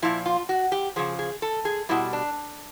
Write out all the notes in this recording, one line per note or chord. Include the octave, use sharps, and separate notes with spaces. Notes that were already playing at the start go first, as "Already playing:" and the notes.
A#2 F3 E4
F4
F#4
G4
C#3 F3 G#4
G#4
A4
G#4
B2 G3 E4
D4